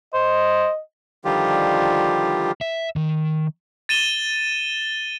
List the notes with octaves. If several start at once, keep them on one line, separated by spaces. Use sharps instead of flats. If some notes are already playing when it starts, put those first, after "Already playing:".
C5 D#5
D3 D#3 F3 G3 F4 G4
E5
D#3
A6 D#7 E7 G7